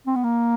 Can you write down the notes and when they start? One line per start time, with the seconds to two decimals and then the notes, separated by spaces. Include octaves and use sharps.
0.07 C4
0.16 B3
0.24 A#3